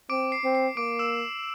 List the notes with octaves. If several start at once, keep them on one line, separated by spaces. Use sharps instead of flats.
C4 D6 D7
C7
C4
C7
A#3 D6 D7
E6 E7